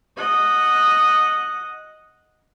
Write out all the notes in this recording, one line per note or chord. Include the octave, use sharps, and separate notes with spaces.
D#5 F#5